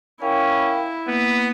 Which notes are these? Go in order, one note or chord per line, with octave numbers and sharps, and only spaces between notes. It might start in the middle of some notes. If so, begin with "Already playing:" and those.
C#4 E4 A#4 F5 G5
A#3 B3